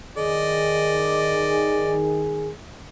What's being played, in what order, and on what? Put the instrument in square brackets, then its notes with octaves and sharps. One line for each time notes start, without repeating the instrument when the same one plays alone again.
[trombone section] D#3 G#4 [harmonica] D5 D#5